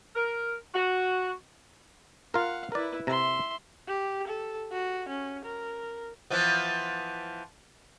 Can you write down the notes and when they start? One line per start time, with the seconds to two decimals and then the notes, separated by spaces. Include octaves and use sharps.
0.15 A#4
0.74 F#4
2.34 F4 A#4 F5 F#5
2.72 E4 A#4 B4 D5
3.07 C3 E5 A#5 C6
3.88 G4
4.28 A4
4.73 F#4
5.09 C#4
5.45 A#4
6.30 E3 F3 B3